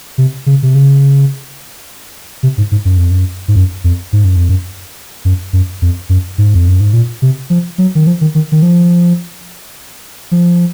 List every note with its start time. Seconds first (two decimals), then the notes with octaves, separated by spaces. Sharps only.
0.18 C3
0.46 C#3
0.63 C3
0.75 C#3
2.43 C3
2.58 G#2
2.72 G#2
2.85 F#2
2.97 F2
3.11 F#2
3.48 G#2
3.56 F#2
3.84 F2
4.13 G#2
4.25 F#2
4.36 F2
4.49 F#2
5.25 F#2
5.53 F#2
5.82 F2
6.09 F#2
6.38 G#2
6.54 F2
6.68 F#2
6.80 G#2
6.93 A#2
7.22 C3
7.50 F3
7.78 F#3
7.95 D#3
8.07 F3
8.21 D#3
8.35 D#3
8.52 D#3
8.62 F3
10.31 F3